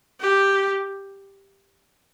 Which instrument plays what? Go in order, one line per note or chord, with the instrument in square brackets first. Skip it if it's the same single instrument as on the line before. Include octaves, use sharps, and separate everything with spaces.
[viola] G4